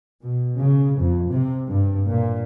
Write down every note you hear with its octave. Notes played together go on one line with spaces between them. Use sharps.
B2
C#3
F2
C3
G2
A#2